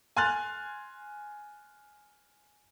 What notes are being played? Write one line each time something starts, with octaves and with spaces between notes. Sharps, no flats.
G#5 C6 F6 F#6 A6